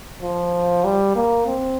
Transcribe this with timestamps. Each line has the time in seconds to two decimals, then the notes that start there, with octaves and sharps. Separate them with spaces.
0.22 F3
0.85 G3
1.15 A#3
1.46 C4